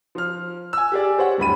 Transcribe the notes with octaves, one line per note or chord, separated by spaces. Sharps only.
F3 F6
G#5 E6
G4 G#4 D5
G4 C5 C#5 F#5
D1 G2 B5 D#7